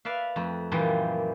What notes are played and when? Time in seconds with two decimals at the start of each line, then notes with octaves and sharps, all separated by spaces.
0.05 B4 D5 E5 F5
0.36 F2 A3
0.71 F#2 A#2 E3 F3 G3